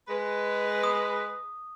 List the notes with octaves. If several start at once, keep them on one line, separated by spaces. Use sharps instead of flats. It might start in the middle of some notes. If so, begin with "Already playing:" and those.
G#3 B4
D#6